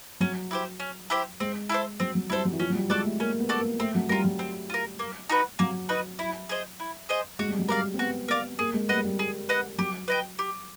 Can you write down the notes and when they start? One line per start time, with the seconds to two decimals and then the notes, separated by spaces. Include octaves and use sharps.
0.20 F#3 C#4
0.51 E4 G4 C5
0.80 C#4
1.10 E4 G4 C5
1.40 G#3 C4
1.69 E4 A4 C5
2.00 F#3 C4
2.15 F#3
2.30 G3 E4 A4 C5
2.45 F#3
2.52 E3
2.59 F3 C#4
2.70 F#3
2.75 G3
2.90 G#3 F#4 A4 D5
3.04 A3
3.20 A#3 C#4
3.40 B3
3.49 F#4 A4 D5
3.60 A#3
3.80 A3 C4
3.95 F#3
4.09 G3 F4 A#4
4.24 F#3
4.39 C4
4.70 F4 A#4
4.99 A#3
5.29 D#4 F#4 B4
5.59 F#3 A#3
5.89 D#4 F#4 B4
6.19 E4
6.49 G#4 C5 D#5
6.80 E4
7.09 G#4 C5 D#5
7.39 G#3 F#4
7.49 G3
7.59 F#3
7.68 G3 A#4 D5 F5
7.94 C4
7.99 B3 F#4
8.28 B3 A#4 D5 F5
8.59 A#3 G#4
8.74 G#3
8.89 G3 B4 D#5 F#5
8.96 G#3
9.04 G3
9.19 G#4
9.49 B4 D#5 F#5
9.78 F#3 G4
10.08 B4 D#5 G5
10.39 G4